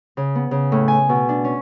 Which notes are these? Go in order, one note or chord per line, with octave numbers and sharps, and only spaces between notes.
C#3
B3
C#3
A2
G#5
B2
D4
C#4